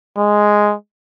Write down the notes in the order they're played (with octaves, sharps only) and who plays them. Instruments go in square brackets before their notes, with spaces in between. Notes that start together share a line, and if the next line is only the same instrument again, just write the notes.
[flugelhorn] G#3